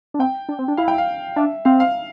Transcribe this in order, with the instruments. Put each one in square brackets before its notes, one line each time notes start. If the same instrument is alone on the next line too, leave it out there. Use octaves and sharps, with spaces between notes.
[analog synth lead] D4
[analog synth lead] C4 [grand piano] G5
[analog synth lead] D4
C4
D4
[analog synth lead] E4 [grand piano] F5
[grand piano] G5
F5
[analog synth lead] D4 [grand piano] E5
[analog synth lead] C4 [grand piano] F5
[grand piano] F5